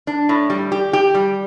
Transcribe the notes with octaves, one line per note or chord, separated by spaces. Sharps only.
D4
A2
G3
G4
G4
G3